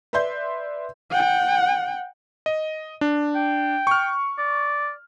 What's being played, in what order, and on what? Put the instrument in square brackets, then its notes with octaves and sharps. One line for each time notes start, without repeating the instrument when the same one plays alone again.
[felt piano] B4 D5 E5 C6 G6
[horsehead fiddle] F#5 G5
[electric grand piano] D#5
D4
[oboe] G5
[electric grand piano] C#6 F6
[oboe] D5